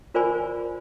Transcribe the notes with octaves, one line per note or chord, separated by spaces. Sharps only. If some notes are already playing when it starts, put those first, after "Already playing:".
F4 A#4 C5 D5 G#5 B5